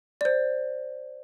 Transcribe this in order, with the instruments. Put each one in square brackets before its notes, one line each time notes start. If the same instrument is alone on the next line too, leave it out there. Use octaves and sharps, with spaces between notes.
[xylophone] C5 D5